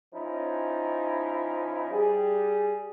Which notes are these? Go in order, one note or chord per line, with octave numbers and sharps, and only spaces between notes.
F3 C#4 D#4 E4
G3 G#4